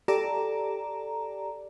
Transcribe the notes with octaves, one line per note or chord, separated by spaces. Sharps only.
G4 A4 D5 A#5